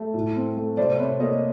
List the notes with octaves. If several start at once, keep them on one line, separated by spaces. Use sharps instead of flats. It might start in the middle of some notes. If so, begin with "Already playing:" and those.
Already playing: A3
A2
C4
A3
C3 C5 D5
C3 B4 C#5
A#3 C#5 D#5